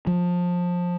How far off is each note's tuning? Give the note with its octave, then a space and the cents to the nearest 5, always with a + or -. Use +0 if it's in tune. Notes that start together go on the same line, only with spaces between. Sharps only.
F3 +20